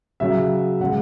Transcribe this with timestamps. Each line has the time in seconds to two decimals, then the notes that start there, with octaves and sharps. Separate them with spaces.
0.20 C#3 F#3 E5
0.80 C#3 G#3 F#5